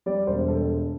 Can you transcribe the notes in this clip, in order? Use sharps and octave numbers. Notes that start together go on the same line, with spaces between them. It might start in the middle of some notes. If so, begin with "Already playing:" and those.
G3 D5
E1 C5
A4